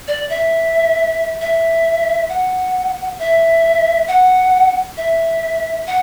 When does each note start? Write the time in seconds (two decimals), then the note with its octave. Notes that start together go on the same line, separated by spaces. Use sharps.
0.08 D5
0.29 E5
1.41 E5
2.29 F#5
3.19 E5
4.08 F#5
4.97 E5
5.87 F#5